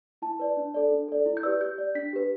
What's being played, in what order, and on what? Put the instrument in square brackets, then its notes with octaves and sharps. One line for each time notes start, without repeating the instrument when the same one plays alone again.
[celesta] E4 A5
B4 D5
D4
A4 D5
D4
A4 D5
E4
G6
G4 B4 D5 E6
G4 G6
D5
D4 B6
G4 B4